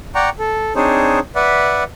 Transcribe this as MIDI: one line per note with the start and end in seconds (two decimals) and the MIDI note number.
0.15 0.30 74
0.15 0.30 78
0.15 0.30 79
0.15 0.30 82
0.15 0.30 85
0.39 0.73 69
0.76 1.20 60
0.76 1.20 62
0.76 1.20 63
0.76 1.20 68
0.76 1.20 72
0.76 1.20 73
1.36 1.84 71
1.36 1.84 74
1.36 1.84 76
1.36 1.84 78